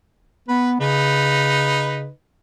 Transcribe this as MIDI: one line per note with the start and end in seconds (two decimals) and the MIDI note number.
0.48 0.79 59
0.48 0.70 71
0.81 2.08 49
0.81 2.10 63
0.81 2.10 71